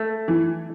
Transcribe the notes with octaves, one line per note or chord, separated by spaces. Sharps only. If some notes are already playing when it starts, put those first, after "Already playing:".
Already playing: A3
E3